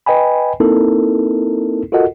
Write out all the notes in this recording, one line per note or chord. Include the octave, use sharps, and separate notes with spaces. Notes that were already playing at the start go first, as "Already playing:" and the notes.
B4 D#5 G5 G#5 B5
A#3 C4 D#4 E4 A4 A#4
F4 F#4 A4 A#4 D#5 F#5